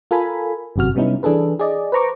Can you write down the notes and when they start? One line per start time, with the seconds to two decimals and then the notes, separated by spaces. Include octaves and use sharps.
0.11 F4 A4 A#4 G#5 B5
0.76 G1 F#2 C3 F#4 F6
0.95 C3 G3 B3 C#4 D#4 E4
1.23 E3 D4 G#4 A4 B4
1.59 G#4 D5 D#5
1.92 B4 C5 A#5 C#6 D6